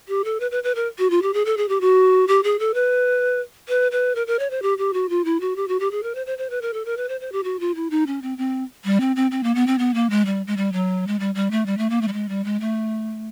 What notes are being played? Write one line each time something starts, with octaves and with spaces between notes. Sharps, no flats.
G4
A4
B4
B4
B4
A#4
F#4
F4
G4
G#4
A4
G#4
G4
F#4
G4
G#4
A4
B4
B4
B4
A#4
A#4
C#5
C5
G4
G4
F#4
F4
E4
F#4
G4
F#4
G4
G#4
A#4
C5
C5
C5
B4
A#4
A4
A#4
B4
C5
C5
G4
F#4
F4
E4
D#4
C#4
C4
C4
G3
C4
C4
C4
A#3
B3
C4
B3
A#3
G#3
G3
G#3
G3
F#3
G#3
G3
G3
A3
G3
A3
A#3
A3
G3
G#3
G3
G#3
A3